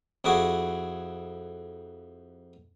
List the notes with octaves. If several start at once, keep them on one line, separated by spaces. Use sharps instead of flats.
F2 E4 F#4 G#4 D6